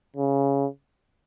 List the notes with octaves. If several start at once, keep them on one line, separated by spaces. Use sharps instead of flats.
C#3